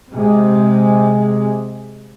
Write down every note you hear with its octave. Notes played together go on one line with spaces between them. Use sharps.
C3 G#3